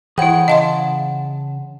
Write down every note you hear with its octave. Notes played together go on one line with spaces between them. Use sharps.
E3 E4 G#4 C5 C#5 F#5 G5
C#3 D#5 F5 A5 C6